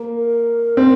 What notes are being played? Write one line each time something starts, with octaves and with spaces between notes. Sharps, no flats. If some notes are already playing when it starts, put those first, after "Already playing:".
Already playing: A#3
A#4
C4